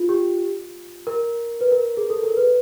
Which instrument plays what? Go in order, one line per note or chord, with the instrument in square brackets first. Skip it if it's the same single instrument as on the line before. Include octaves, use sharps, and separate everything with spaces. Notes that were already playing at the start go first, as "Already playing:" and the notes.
Already playing: [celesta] F4
G4
A#4
B4
A#4
G#4
A4
A#4
B4